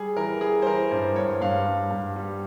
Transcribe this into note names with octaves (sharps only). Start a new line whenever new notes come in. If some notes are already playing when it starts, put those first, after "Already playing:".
Already playing: G3 G#4
E3 A#4
G3 G#4
C5
E3 A#4
G2 C5
G2 C#5
G2 F5
G2
G2
G3